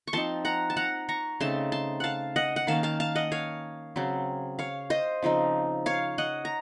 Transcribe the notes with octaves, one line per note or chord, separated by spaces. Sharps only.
C#6
F3 C4 D#4 A5 C6
F#5 A#5
A5
F#5 A#5
A#5 C#6
C#3 A3 C4 D#4 A5 C6
A5 C6
F5 F#5 A5
D#5 F#5
F#5
D#3 A#3 C#4 F5 A5
F5 A5
F5 A5
D#5 F#5
C#5 F5
C#3 F#3 C4
C#5 F5
C5 D#5
C#3 F3 C4 D#4
C#5 F5
D#5 F#5
A#5